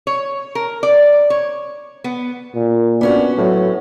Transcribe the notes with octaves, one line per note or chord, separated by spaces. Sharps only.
C#5
A#4
D5
C#5
B3
A#2
B3 C#4 D4 F#4
A2 F#3